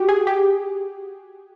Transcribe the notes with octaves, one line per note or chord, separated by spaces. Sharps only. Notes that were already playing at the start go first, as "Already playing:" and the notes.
Already playing: F#4 G4
G#4
G4